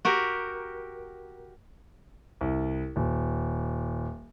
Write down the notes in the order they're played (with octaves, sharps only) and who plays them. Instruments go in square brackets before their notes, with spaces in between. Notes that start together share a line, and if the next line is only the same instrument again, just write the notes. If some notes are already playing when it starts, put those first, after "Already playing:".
[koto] F#4 G4 A#4
[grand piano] C2
D#1